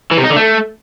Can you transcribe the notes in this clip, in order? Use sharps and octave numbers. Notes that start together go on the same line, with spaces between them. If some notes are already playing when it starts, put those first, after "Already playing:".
E3
C3
D#4
D3
A3